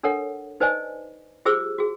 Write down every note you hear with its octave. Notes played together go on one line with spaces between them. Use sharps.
D4 A4 A#4 C#5 F#5
D#4 B4 C5 D5 D#5 G#5
F4 G4 G#4 C5 D6 E6
F#4 G#4